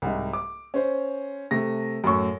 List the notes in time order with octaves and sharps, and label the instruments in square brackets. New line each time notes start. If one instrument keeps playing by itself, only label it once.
[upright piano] C2 G#2
D6
C#4 C5
C3 A3 A#6
F#2 A2 C#6